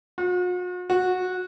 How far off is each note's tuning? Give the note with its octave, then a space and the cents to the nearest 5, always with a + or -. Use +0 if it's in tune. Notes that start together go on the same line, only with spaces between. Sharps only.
F#4 -45
F#4 -15